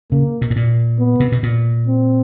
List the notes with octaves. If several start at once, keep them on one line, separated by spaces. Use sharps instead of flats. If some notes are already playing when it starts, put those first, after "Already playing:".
C#3 A#3
B2
A2
A#2
B3
C3
B2
A#2
C4